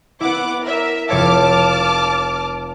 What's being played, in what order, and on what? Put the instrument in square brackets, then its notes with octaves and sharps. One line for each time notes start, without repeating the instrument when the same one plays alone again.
[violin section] B3 F#5 D6 [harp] E4
[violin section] A#4 E5
[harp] F1 C#5 F5 [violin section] A5 D6 F6